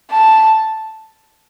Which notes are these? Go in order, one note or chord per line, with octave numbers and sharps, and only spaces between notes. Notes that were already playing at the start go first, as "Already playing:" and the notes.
A5